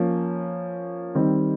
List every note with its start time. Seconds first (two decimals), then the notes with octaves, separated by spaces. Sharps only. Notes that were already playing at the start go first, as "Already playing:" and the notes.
Already playing: F3 A#3 C#4
1.15 D#3 G3 C4